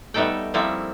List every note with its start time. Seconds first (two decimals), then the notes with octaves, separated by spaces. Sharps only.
0.14 G3 A3 B3 D#4 A4 G5
0.54 F3 G3 A#3 C4 E4 A4